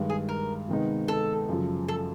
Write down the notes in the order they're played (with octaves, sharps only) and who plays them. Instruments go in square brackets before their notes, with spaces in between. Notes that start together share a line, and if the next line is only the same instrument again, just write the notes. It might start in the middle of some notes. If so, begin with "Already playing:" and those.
Already playing: [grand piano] G2 D#3 G#3
[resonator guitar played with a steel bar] G#4
A#4
[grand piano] C3 D#3 G#3 B3 D#4
[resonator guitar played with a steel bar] A4
[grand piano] F#2 C#3 F3
[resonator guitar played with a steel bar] A4